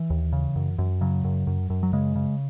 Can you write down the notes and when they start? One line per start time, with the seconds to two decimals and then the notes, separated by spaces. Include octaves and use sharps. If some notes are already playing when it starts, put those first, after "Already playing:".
Already playing: E3
0.10 D#2
0.33 C#3
0.56 F#2
0.78 F#2
1.01 C#3 F#3
1.24 F#2
1.47 F#2
1.70 F#2
1.83 F#3
1.93 C#3 G#3
2.16 C#3